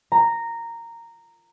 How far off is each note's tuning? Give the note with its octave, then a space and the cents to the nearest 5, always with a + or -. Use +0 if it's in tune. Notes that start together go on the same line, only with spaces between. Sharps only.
A#5 -10